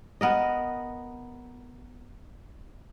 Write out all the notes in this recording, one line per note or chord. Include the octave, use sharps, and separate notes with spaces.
B3 A#4 D#5